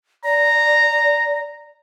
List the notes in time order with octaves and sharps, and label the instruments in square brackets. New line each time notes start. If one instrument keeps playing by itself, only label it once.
[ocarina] D5 [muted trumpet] A#5